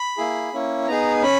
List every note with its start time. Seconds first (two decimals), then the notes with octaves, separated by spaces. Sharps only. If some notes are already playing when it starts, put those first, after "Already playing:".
Already playing: B5
0.17 A#3 E4 G#4
0.53 A#3 C#4 E4
0.88 B3 D#4 G#4 A#5
1.22 C#4 B5